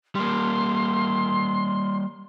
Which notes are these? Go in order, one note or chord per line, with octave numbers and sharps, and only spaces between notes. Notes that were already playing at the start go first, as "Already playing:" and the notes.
G3 A#3 C6